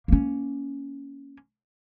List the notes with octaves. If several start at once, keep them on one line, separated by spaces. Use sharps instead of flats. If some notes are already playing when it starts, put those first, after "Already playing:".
A#3 C#4